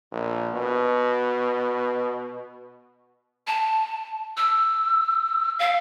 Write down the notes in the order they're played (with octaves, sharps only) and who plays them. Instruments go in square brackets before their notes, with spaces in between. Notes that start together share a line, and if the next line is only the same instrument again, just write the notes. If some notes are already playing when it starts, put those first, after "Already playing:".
[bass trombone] A#1
B2
[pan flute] A5
E6
F5